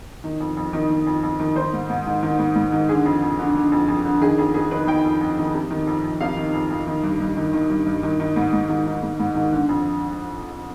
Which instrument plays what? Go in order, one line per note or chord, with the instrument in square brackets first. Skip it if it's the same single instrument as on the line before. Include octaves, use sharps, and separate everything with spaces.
[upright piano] D#3
F2
F2
D#3
D#3
F2
F2
D#3
D#3 C5
G#2
G#2
D#3
D#3
G#2
G#2
D#3
D3 G#4
F2
F2
D3
D3
F2
F2
D3
D#3 G#4
F2 G#4
F2 G#4
D#3 B4
D#3 G5
F2
F2
D#3
C3
D#3
F2
F2
C3 F5
D#3
F2
F2
D#3
G2
G2
D#3
D#3
G2
G2
D#3
D#3
G#2
G#2
D#3
D#3
G#2
G#2
D#3
D3
F2